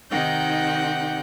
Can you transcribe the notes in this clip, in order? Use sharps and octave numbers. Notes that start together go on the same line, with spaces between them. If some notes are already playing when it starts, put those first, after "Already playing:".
C3 D#3 D#4 F#5 G5 G6